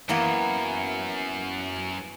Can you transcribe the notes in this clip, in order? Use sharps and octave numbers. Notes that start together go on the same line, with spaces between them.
F#2 E3 A#3 B3